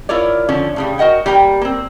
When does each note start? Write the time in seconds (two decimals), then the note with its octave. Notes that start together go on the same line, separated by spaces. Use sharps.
0.09 E4 F4 A#4 C#5 D5
0.49 D3 F3 C#4
0.76 A2 C#3 G3
0.98 F#4 A#4 D#5 F#5 G5
1.26 G3 A#3 G4 G5 A#5
1.61 A#3 C4